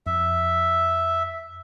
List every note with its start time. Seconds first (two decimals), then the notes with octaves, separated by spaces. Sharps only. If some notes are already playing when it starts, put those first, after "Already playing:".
0.07 F2 E5